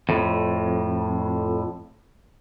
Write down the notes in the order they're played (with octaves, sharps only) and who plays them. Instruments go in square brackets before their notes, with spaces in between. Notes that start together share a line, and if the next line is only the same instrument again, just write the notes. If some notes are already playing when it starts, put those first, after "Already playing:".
[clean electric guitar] F2 A2